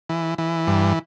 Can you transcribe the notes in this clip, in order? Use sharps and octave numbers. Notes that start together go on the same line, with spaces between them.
E3
E3
G2